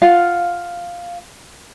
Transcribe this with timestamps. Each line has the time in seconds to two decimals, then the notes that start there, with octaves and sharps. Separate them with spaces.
0.02 F4 F5 F#5